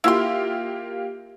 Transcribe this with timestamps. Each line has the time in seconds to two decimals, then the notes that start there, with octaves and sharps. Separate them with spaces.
0.04 A#3 E4 F4 G4 C6